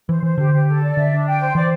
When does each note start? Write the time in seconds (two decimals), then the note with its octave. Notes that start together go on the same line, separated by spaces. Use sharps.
0.09 E3 C5
0.23 E3 C5
0.37 D3 G4
0.53 G4
0.68 A4
0.81 D5
0.96 D3 E5
1.11 D4
1.26 G5
1.41 C5
1.55 E3 D5